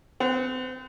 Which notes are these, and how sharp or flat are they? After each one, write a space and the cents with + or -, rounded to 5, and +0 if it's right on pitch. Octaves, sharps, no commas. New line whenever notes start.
C4 -35 F#5 +0